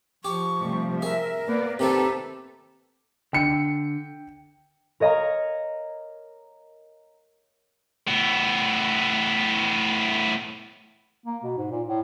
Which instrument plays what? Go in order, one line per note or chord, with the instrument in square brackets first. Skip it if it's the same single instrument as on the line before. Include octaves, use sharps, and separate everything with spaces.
[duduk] F3 [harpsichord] G4 [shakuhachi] C#6
[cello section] C3 G3 A3
[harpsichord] G#4 [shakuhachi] A#4 [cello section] E5
[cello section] A#3 B3 D5 [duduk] B4
[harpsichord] C3 D#3 C4 [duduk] G4 [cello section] A4 B4 [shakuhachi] A#5
[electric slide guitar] D3 [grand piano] G5 C#7
[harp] A#4 C#5 D#5 F5 A#5
[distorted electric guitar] A2 B3
[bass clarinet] A#3
B2
G#2
A#2
A2